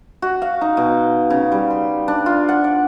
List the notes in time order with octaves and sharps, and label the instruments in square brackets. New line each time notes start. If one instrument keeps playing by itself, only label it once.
[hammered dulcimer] F#4
F5
D#4
B2
C#3
G3
C6
D4
F4
F#5
D5